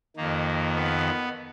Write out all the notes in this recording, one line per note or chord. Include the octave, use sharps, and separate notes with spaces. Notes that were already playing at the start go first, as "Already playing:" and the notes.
F2 D#3 A#3
B3